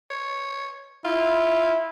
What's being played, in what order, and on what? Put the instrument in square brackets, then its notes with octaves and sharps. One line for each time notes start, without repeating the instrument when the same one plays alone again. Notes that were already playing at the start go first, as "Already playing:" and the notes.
[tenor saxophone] C#5
[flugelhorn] E4 [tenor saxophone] F4